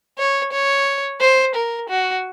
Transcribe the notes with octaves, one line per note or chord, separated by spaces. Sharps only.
C#5
C#5
C5
A#4
F#4